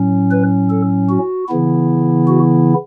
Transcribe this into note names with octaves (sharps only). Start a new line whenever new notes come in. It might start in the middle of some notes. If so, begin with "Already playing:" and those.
Already playing: A2 F#3 C#4
B4
A4
F#4
C#3 E3 B3 E4
F#4